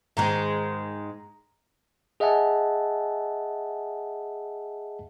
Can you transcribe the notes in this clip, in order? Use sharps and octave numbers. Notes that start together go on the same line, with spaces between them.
G#2 D#3 G#3 A#5
G#4 D#5 E5 F#5 G#5 A5